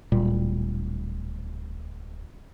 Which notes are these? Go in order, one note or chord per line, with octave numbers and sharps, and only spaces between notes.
D1 A#2 G3